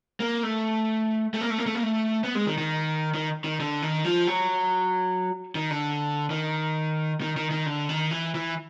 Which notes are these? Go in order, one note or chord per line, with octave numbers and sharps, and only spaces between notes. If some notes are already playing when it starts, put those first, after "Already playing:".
A#3
A3
A3
A#3
A3
A#3
A3
A#3
A3
B3
G#3
D#3
D#3
D#3
D#3
D3
D#3
F3
F#3
D#3
D3
D#3
D#3
D#3
D#3
D3
D#3
E3
E3